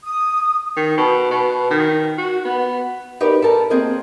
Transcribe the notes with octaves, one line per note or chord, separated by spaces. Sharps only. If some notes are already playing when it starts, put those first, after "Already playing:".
D#6
D#3
B2
B2
D#3
F#4
B3
D#4 G4 A#4 B4 D5
A4 A#4 A5 A#5
A#3 C4 G#4 D#5